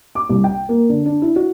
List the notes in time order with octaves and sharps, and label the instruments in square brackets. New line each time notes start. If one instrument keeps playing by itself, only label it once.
[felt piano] D6
C2
G5
A#3
D3
D4
E4
F#4